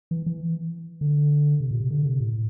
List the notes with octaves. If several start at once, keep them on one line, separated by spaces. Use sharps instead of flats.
E3
E3
D3
C3
A#2
C3
D3
C3
A2